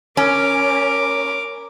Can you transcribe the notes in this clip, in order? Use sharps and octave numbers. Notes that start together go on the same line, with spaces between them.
C#4 A#4 D6